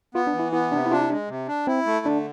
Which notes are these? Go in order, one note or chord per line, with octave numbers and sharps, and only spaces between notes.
B3 F4
D4
E3
E4
B3 E4
C3 D4
E4
D4 F4
E4
G#3 D4
C3
D4
C4 E4
A3
D3 D4